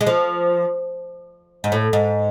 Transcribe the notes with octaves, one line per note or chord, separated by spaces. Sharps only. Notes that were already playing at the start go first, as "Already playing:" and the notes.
G#3
F3
G#2
A2
G#2